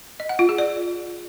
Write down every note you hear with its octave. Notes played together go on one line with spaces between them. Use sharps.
D#5
F#5
F4
G#4
D5